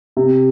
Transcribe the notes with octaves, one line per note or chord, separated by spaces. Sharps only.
C3